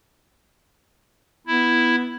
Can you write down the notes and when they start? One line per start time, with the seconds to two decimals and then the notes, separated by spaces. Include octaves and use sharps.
1.47 B3 E4